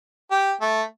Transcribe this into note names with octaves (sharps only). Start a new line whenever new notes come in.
G4
A3